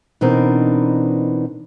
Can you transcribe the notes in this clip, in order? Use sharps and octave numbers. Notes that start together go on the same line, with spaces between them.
B2 E3 C4 D4 D#4 A#4